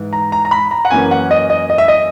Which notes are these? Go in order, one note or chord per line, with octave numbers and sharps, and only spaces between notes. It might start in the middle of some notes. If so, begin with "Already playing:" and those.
Already playing: G#2 E3
A#5
A#5
A#5
B5
A#5
F#5
F#2 E3 A#3 C#4 G#5
F#5
D#5
D#5
D#5
E5
D#5